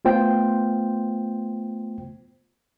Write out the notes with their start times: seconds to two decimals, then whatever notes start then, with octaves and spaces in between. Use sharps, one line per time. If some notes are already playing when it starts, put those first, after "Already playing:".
0.05 A3 B3 F4 C5 G5